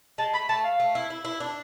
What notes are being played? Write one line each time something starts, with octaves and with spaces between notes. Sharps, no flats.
G#3 A5
A3 B5
A3 A5
F5
A3
E4
E4
E4
D4